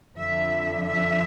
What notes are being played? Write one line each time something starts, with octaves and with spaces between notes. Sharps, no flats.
F2 D3 F3 E5
E5